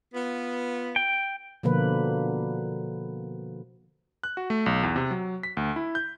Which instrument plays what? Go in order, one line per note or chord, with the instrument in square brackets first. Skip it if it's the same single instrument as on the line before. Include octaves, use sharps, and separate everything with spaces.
[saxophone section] B3 F4
[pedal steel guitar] G5
[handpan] B2 D3 F3 A#3 B4
[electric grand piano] F#6
F#4
A3
B1
E2
C3
F#3
B6
D2
E4
G6